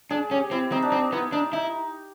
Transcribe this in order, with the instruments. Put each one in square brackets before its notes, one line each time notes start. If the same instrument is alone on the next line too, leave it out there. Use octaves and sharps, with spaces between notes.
[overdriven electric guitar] D4 [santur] G#4
[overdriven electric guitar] C#4 [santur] G4
[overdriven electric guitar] C4 [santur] E4
[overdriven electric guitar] C4 [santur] D#4
[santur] D4
[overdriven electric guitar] C4 [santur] D#4
[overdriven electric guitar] B3 [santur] E4
[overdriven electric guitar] D4 [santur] D#4
[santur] D#4 [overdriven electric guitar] E4